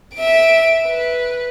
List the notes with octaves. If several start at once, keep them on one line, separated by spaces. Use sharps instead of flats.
E5 D7
B4